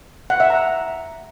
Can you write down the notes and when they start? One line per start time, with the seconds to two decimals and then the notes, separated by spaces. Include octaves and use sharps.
0.30 F#5
0.40 E5
0.50 A#5